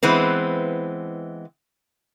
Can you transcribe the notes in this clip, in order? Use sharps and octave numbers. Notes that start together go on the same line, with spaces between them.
E3 G#3 B3 C4